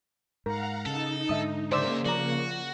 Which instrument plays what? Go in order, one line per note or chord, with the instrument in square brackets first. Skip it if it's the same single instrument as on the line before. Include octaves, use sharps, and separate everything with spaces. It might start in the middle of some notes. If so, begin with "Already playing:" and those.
[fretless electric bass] G#2 [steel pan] A#4 [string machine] F5 F#5 A#5
[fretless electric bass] C#3 [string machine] D#4 [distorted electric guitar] A4
[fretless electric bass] G#2 D3 [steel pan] D#5 E5 D#6
[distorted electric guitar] F#2 E5 [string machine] C#3 A#3 [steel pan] C5 D5 E6
[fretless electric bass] F3 [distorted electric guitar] F#4 [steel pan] D5 A#5